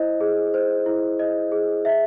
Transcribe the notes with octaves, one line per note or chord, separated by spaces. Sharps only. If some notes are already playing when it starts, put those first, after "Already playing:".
Already playing: E4 C5 D#5
G#4
C5
E4
D#5
G#4
E5